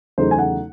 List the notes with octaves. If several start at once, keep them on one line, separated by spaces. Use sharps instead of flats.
E2 C#3 F#3 A3 D#4 C5
G#5
F#5